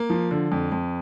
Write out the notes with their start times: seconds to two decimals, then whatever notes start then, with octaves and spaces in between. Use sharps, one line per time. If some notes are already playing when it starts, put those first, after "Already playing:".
Already playing: A#3
0.10 F3
0.31 D3
0.52 F2
0.72 F2